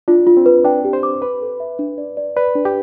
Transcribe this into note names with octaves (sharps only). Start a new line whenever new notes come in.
D4 F4
F4
C4
B4
D4 G5
G4
C5
D6
B4 B5
A4
E5
D4
D5
D5
B4 D5
D4
G4